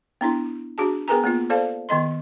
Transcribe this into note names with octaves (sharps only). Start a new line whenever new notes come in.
B3 D4 E4
D4 F#4 G#4 A5
B3 G#4 A#4 B4 G#5 A#5
A#3 B3 F4
A4 C5 D5 F5 A5
D#3 B3 D#5 C6